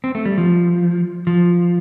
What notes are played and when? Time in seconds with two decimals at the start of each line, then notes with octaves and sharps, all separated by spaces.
0.04 C4
0.15 A3
0.25 G3
0.38 F3
1.27 F3